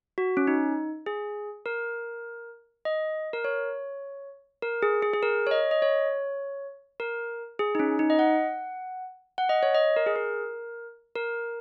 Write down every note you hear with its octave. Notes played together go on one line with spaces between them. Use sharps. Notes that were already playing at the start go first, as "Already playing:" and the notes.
F#4
C#4
D#4
G#4
A#4
D#5
A#4
C#5
A#4
G#4
G#4
G#4
A#4
C#5
D#5
D#5
C#5
A#4
G#4
D#4
C#4
D#4
D#5
F#5
F#5
D#5
C#5
D#5
A#4
G#4
A#4
A#4